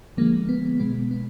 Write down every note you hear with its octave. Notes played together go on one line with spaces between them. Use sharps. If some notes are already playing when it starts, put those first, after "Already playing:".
D3 F3 G#3 A#3
B3
B2 G#3 B3
B3